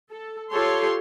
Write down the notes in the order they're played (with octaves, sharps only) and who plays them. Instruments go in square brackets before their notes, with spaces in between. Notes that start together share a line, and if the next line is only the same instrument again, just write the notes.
[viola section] A4
F4 G4 A4 C#5 C6